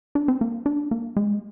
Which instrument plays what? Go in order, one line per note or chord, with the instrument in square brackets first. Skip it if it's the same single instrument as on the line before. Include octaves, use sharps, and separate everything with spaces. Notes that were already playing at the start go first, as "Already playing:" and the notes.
[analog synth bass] D4
C4
A#3
D4
A#3
G#3